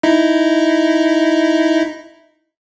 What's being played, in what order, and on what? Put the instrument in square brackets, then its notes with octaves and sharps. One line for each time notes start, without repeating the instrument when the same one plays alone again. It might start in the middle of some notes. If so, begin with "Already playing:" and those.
[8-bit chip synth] D#4 E4